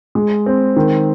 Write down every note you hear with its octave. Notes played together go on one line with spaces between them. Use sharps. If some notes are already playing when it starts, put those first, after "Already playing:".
G#3
C4
D#3